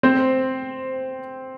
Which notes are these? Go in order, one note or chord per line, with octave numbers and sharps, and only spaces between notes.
C4 C5